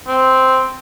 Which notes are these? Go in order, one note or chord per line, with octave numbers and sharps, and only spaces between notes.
C4